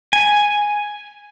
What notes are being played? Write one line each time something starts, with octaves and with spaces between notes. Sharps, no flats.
G#5